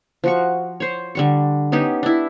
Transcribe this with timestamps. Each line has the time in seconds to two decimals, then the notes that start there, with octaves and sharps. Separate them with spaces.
0.24 F3 F#4 C#6
0.80 C5 C#5
1.15 D3 G3 C#6
1.72 B3 C#4 D#4 G4
2.03 D4 E4